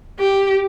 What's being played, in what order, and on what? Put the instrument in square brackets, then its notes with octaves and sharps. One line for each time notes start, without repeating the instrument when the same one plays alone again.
[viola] G4